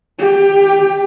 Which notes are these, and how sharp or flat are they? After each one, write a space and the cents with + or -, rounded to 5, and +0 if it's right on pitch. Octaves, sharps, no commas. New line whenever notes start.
G4 +20